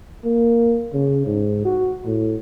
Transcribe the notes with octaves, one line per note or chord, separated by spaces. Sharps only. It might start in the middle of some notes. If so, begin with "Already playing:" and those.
A#3
C#3
G#2
F#4
A2